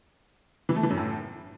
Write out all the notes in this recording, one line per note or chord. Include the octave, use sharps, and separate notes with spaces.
E3
A3
E3
F#2
A2